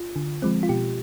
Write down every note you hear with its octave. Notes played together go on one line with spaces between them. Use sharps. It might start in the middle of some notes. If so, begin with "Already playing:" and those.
Already playing: F4
D3
F3 G#3 C4
F4
B2 G4